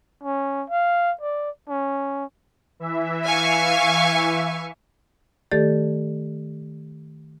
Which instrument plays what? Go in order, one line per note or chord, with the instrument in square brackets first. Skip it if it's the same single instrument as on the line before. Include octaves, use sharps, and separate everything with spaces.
[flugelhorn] C#4
F5
D5
C#4
[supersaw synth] E3 E5
[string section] F5 G#5 C#6
[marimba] D#3 A3 G4 A4 D5 A6